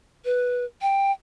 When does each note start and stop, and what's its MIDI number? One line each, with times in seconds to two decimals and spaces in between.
0.25 0.65 71
0.82 1.12 79